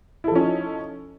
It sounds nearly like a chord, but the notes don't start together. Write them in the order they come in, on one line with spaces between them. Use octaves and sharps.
E4 A4 F3 C#4 D#4